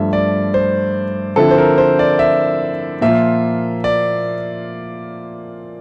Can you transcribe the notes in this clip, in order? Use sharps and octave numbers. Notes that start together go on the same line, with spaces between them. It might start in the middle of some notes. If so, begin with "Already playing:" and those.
Already playing: G2 F3 A3 E5
D5
C5
D3 F3 C4 E4 A4
C5
A#4
C5
D5
E5
A#2 F3 A#3 F4 E5
D5